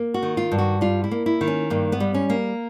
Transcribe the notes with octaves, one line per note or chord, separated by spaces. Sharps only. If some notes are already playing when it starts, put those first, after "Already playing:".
Already playing: A#3
F#4
D#3
F4
G2
F#4
G3 F4
E4
A#3
E4
D#3
C#4
G2 A#3
B3
G3
C#4
A#3